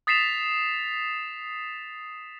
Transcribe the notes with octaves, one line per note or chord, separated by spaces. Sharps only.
D#6 A6 B6 C7 E7 F7